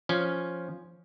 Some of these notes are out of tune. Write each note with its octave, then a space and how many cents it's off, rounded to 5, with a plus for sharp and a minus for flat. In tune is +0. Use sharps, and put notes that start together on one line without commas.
F3 +0 C#4 +0